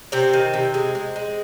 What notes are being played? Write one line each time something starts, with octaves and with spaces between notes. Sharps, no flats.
C3 C4
D#3
C3
G#3
G#3
G#3